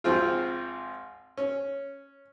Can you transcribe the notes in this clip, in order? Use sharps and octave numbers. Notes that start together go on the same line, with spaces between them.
G#1 F3 C4 F4
C#4